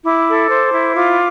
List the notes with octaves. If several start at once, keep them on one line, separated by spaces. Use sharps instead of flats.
E4 D6
A4
C5
E4
F4 D6